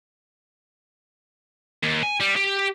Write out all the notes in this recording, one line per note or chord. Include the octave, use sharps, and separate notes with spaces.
D#2
G#5
G3
G4